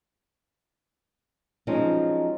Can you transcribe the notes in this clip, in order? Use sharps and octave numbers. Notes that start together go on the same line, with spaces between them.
F3 F#3 G#3 C4 C#4 D#4